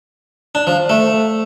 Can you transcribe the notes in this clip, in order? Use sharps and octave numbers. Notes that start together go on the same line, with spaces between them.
D4
F3
A3